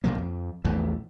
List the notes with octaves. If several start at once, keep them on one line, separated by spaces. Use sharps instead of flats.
B1 A#2 F3 A#3
F2
A#1 E2 E3 A3